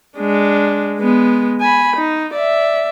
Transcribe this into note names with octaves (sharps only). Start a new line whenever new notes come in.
G#3 D4
G#3 B3
G#5 B5
D#4
D5 E5